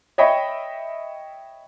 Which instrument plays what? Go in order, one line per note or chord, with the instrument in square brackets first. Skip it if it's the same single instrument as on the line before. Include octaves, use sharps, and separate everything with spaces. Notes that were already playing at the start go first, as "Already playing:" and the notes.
[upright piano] C#5 D#5 E5 G5 B5 C#6